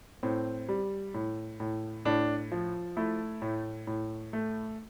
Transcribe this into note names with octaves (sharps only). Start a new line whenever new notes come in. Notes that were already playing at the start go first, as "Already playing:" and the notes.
A2 C4
G3
A2
A2
A2 D4
F3
A3 E4
A2
A2
A3